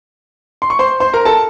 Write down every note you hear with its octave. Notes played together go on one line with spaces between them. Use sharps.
C6
C#6
C5 C6
C5 C6
A#4 A#5
A4 A5